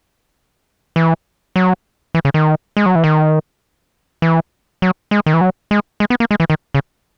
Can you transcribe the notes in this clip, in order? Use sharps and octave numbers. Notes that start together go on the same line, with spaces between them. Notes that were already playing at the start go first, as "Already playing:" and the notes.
E3
F#3
E3
C#3
D#3
G#3
F#3
E3
D#3
E3
F#3
G#3
D#3
E3
F#3
G#3
G#3
B3
A#3
G#3
E3
D#3
C#3